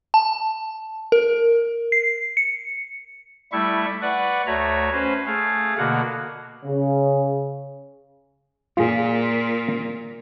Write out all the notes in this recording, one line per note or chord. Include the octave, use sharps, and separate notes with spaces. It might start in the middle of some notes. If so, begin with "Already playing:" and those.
A5
A#4
C7
C#7
G3 A3 E4 E5 C#6
B4 D5 F#5 C#6
D2 A3 F#4 C#5 E5 A#5
C#4 B4 C5
A3 G#4 F5
B2 D3 A#3 F#4 F#5
C#3
A#2 F4 G#4